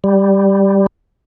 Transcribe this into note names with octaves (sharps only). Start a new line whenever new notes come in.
G3